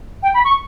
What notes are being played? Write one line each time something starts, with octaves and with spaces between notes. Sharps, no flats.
G5
B5
C#6